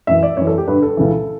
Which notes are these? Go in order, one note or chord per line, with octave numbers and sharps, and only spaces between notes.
F#2 E3 E5
D5
F#2 E3 C#5
A4
G4
G2 D3 B4
A4
C#2 C#3 E3